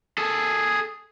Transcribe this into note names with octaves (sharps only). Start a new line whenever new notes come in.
G#4 A4